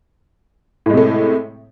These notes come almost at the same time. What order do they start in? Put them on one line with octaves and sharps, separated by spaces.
A2 G#3 C3 A3